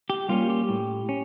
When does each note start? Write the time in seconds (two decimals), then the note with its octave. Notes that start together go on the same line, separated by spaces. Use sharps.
0.10 G4
0.29 G3 A#3 C#4 F4
0.50 G4
0.69 A2
1.09 C#4